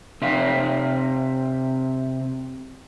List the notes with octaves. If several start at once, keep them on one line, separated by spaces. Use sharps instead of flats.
C3 E5 F5